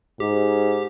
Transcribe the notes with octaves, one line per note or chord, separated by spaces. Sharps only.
G#2 G4